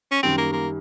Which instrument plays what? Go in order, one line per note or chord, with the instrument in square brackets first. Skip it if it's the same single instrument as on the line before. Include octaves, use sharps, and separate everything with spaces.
[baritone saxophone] C#4
[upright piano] F#2 D#3 G3 [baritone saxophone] C4
[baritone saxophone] A#3
A#3